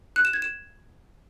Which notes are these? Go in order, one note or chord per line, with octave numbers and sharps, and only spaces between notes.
F#6
E7
G#6
E7